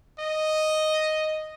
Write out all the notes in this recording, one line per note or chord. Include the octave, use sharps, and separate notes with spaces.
D#5